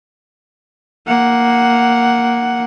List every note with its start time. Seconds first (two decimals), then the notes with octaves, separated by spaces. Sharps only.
1.07 A#3 F#5